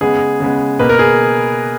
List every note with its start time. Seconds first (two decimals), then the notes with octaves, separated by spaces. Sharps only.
0.01 C#3 G#3 B3 G#4
0.40 C#3 G#3 B3
0.79 B2 A#3 B4
0.89 A#4
0.99 G#4